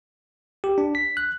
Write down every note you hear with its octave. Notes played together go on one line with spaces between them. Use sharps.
G4
D4
B6
F#6